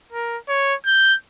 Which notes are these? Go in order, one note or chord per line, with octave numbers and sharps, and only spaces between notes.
A#4
C#5
G6